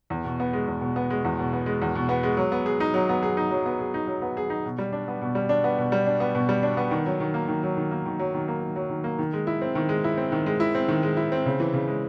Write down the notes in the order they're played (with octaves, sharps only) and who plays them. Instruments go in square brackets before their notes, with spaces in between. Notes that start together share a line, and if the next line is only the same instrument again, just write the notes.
[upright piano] E2
B2
B3
G#3
E2
B2
B3
G#3
E2
B2
B3
G#3
E2
B2
B3
G#3
F#3
B3
G#4
D#4
F#3
B3
G#4
D#4
F#3
B3
G#4
D#4
F#3
B3
G#4
D#4
B2
G3
D4
B3
B2
G3
D4
B3
B2
G3
D4
B3
B2
G3
D4
B3
D#3
F#3
D#3
A#3
D#3
F#3
D#3
A#3
D#3
F#3
D#3
A#3
D#3
F#3
D#3
A#3
D#3
G#3
E4
C4
D#3
G#3
E4
C4
D#3
G#3
E4
C4
D#3
G#3
E4
C4
C#3
E3
C#3
G#3